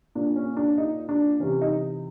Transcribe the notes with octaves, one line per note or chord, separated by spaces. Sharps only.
A#2 D4
C#4
D4
D#4
D4
C3 E3 C#4
D#4